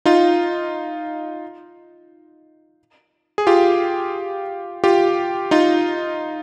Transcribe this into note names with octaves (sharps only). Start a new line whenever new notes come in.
D#4 F4
G#4
F4 G4
F4 G4
D#4 F4